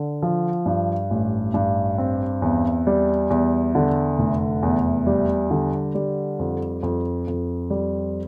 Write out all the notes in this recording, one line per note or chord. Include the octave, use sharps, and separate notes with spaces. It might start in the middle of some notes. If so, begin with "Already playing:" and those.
Already playing: D3
F3
G2
A1
G2
C4
E2
G3
E2
D3
F1
E2
G3
D3
G3
F2
F2
F2
G3